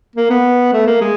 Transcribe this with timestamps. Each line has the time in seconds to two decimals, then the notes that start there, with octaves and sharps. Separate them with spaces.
0.16 A#3
0.30 B3
0.73 A3
0.87 A#3
1.01 G#3